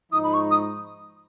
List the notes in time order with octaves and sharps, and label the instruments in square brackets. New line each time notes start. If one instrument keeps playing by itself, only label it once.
[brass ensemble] G#2 F3 G#3 D#4 [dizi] D#6
[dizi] B5
C#6
D#6